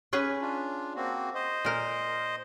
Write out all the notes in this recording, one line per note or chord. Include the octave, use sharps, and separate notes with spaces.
C#4 G#4 B4
D4 F4
A#3 C4 F#4
C5 D#5
A#2 A#4